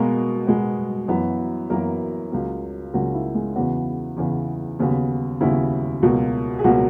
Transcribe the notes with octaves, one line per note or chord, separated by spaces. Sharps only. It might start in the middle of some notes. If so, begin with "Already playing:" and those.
Already playing: B2 G#3 A#3 B3 A#4
B2 G#3 B3
F#2 E3 B3
F#2 E3 A#3 B3 A#4
C#2 C#3 F#3 A#3
C#2 C#3 F#3 A#3 F#4
E4
G#3 G#4
E2 C#3 E3 B3 F#4
E2 C#3 E3 B3
D#2 C#3 F#3 B3
D#2 C#3 F#3 B3 E4
C#2 B2 F#3 A#3
G#4
C#2 B2 F#3 A#3 F#4